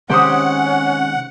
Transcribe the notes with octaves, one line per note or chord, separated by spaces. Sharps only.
C3 D#3 G#3 C#4 G4 C5 F#5 D#6